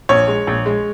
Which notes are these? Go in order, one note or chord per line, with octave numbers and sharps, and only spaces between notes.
A#1 C#5
G#3
A#1
G#3